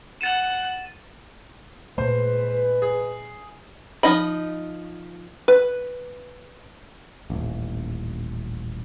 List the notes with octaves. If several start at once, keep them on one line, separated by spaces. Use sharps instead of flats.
F#5 F#6 A6 D#7 E7
A#2 G#3 A3 B4 C5
G#4
F3 D#4 D#5 B5
B4
D#1 A1